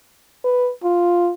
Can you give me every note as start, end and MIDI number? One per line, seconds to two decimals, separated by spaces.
0.44 0.70 71
0.84 1.31 65